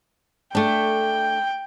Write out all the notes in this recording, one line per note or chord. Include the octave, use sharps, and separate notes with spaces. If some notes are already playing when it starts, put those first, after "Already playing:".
A3 D4 G5